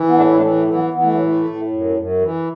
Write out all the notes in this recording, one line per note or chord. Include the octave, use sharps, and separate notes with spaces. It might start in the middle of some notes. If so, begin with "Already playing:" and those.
Already playing: E3
B3
A2 A3 D4
E4
A3 D4
E3
A3
E3
F#3 B3
E3 B3
A3
F#3
A2 A3
A2
F#2
F#2
E3